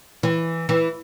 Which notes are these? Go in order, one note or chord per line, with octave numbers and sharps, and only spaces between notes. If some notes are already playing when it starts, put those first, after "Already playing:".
E3
E3